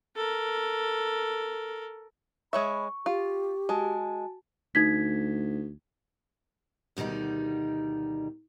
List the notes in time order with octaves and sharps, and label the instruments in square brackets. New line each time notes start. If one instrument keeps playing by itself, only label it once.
[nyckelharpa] A4 A#4
[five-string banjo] G#3 C#5 E5 [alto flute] B5 [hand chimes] C#6
[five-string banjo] F4 [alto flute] G4
[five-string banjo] G#3 [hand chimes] F#4 G#5 A5
[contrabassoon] D2 [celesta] D#4 G#6 B6
[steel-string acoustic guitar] D2 B2 D#3 G3 D#4